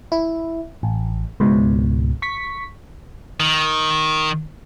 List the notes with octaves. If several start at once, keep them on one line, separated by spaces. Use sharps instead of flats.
E4
A1
C#2 G#2 B2
C#6 B6
D#3